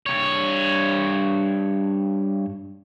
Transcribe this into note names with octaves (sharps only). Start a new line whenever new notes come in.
G2 C#5